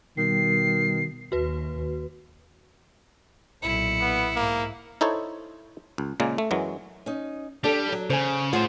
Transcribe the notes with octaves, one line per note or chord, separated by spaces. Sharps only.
B2 D#3 G3 C7
D#2 F#4 B4
B1 A#2 E4 C#7
B3
G#2 A#3
D#4 E4 A4 C5 C#5
C#2
A#2 C#3 G#3 A#3
A3
F#2 E3 F#3 G#3
C#4 D#4
G3 D4 A4
F#3
C#3 C5 G#5
A2 F4 G#4 C5 F#5